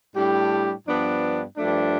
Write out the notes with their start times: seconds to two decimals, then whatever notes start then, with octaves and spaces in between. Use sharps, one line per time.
0.14 A2 G3 D4 G4
0.86 G2 F3 B3 D4
1.56 G2 F3 A3 D4